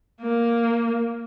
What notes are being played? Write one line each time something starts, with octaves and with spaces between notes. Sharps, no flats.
A#3